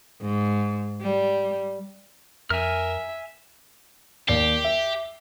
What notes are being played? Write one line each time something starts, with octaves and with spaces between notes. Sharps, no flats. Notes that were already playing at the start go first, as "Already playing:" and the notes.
G#2
G3
F2 A#4 E5 G#5 F6
D#2 G4 D5 C7
E5